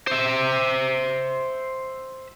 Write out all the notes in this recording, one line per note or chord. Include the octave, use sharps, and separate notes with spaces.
C5 E5